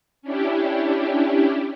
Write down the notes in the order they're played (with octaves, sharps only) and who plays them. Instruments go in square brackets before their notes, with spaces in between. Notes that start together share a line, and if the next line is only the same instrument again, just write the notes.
[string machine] C#4 D4 E4 G4